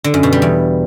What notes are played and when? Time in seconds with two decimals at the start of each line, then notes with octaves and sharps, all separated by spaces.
0.04 D3
0.14 F#2
0.23 B2
0.33 G3
0.42 E2